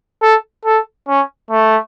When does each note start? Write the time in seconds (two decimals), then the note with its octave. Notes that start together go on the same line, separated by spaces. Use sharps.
0.22 A4
0.65 A4
1.08 C#4
1.51 A3